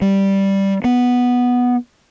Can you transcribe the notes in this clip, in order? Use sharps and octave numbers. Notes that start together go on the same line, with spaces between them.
G3
B3